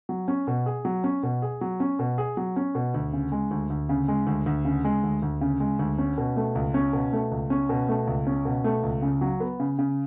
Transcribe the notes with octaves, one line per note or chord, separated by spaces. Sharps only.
F#3
C#4
B2
G#4
F#3
C#4
B2
G#4
F#3
C#4
B2
G#4
F#3
C#4
B2
D2
C#3
G#3
D2
D2
C#3
G#3
D2
D2
C#3
G#3
D2
D2
C#3
G#3
D2
C#4
B2
A3
C#2
C#4
B2
A3
C#2
C#4
B2
A3
C#2
C#4
B2
A3
C#2
C#3
F#3
B3
C#3
C#3